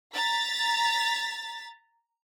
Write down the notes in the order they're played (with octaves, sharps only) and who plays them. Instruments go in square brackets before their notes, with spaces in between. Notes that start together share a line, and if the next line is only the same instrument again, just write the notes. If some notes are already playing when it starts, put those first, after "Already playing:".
[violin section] A#5 A6 B6